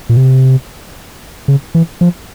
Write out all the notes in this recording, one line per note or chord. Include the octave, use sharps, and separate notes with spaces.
A#2
C3
C#3
E3
F3